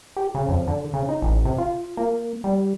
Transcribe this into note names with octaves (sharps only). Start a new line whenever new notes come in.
G4
C#3
F2
D3
C#3
D#4
A1
C3
F4
A#3
G3